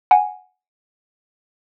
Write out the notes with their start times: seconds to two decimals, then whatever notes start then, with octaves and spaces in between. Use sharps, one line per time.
0.11 F#5 G#5